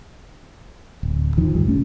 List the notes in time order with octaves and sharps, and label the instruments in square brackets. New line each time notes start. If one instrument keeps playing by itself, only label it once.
[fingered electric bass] D1
E2 D#3 F3
G1 C2 G2 G3
B2 A3 C#4